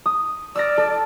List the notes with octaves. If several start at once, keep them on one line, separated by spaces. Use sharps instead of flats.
D#6
D5 E6 F6 A#6
A4